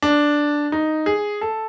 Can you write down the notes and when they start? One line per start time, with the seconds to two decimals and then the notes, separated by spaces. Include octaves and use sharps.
0.02 D4
0.72 D#4
1.06 G#4
1.41 A4